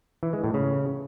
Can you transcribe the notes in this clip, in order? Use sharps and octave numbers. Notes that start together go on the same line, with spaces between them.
E3
G#3
A2
C#3